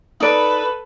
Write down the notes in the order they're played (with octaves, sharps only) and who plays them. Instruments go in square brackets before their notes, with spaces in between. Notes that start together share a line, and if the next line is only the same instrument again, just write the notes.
[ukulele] D#4 D5 [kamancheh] A4 B4